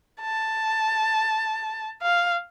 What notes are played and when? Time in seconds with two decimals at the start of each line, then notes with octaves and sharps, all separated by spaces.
0.21 A5
2.03 F5